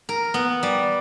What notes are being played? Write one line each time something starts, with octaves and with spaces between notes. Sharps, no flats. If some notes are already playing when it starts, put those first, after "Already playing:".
A#4
B3
G3